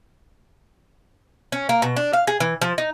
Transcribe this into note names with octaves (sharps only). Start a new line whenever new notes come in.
C#4
A#3
B2
D4
F5
G#4
E3
F3
D#4